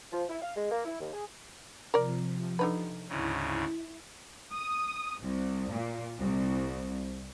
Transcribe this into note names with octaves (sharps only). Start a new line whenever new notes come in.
F3
E4
F5
G#3
A#3
E4
D#2
G#4
C3 F3 A#4 D5
D3 D#4 B4
D2 G#2 C#3 E4
D#6
C2
A#2
C2